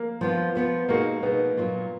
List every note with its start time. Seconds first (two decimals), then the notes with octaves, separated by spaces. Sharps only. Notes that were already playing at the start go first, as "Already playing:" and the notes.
Already playing: A#3
0.21 F3 B3 F4
0.55 F3 B3 F4
0.88 B2 G#3 A#3 D#4 F#4
1.22 B2 G#3 B3 D#4 F#4
1.57 A#2 F#3 A#3 F4